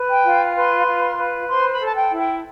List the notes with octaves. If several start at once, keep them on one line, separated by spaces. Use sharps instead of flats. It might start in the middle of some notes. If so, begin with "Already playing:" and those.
Already playing: B4
G5
F4
B4 C6
F4
B4
C5 C6
B5
A4 A5
G5
E4
G5